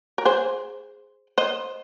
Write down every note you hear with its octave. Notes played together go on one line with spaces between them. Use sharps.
A#4
G#4 C5
C5 D#5